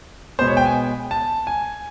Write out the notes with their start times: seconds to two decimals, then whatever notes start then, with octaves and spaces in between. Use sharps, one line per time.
0.39 B2 G#3 B3 C5
0.47 C#5
0.57 G5
0.66 G#5
1.11 A5
1.47 G#5